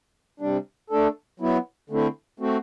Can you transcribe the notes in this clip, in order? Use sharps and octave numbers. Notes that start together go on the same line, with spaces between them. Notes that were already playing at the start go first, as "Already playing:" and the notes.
C3 G3 D4
A3 D4 A4
F#3 B3 E4
D3 A3 C4 E4
A3 C4 F#4